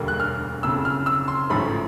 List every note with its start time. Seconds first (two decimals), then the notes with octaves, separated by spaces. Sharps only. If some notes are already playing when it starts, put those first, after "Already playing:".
Already playing: E1 D2 D3 G3 A#3
0.08 F#6
0.20 F6
0.63 F#1 F2 C#3 E6
0.85 F6
1.06 E6
1.28 C6
1.49 A1 G#2 F3 A3 C#4 B5